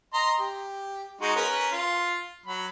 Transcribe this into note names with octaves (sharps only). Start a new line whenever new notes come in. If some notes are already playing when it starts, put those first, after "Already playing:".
D#5 A#5 C6
G4
G#3 D#4 F#4
C#4 A#4 B4
F4
F#3 B5